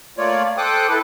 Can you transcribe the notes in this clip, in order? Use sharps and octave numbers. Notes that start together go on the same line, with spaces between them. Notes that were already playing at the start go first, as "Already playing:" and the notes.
A3 A#3 F4 C#5 D5
A4 C5 G5 D6 D#6 F#6
E4 A4 B4